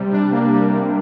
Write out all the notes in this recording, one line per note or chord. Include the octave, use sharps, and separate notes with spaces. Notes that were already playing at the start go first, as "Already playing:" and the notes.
Already playing: C3 G3
D4
A#3
G3
C3